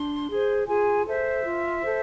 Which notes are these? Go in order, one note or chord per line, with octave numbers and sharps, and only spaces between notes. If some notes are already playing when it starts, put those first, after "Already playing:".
Already playing: D4 C6
G#4 C5
F4 G#4 G#5
A4 C5 E5
F4
A4 C5